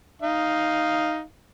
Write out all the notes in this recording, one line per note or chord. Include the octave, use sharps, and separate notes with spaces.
D#4 F5